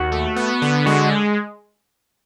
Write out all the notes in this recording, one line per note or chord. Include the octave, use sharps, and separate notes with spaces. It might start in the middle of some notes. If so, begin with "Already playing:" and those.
Already playing: D#2 F#4
A3
B3
D3
G#3 F#4